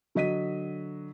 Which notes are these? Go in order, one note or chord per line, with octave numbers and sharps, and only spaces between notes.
D3 F#3 D#5 B6 D#7